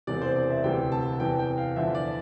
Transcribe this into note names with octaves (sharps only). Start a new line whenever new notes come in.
E1 E2 C3 D5
C5
D5
E5
D2 C3 E3 G5
A5
A5
E2 C3 E3 G5
G5
F5
E2 D3 F3 E5
D5